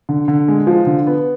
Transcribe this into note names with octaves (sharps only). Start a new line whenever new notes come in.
D3
D3
G#3
F3
D3
B3